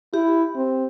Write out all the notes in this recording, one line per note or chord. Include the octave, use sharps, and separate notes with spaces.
E4 G4
C4